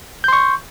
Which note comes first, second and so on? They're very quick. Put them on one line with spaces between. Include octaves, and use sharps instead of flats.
G6 C6 C#6